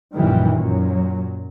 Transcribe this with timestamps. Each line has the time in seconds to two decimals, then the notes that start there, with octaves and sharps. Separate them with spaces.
0.15 A#1 F#2 A#2 D#3 E3 G3
0.56 F#2 A#2 F#3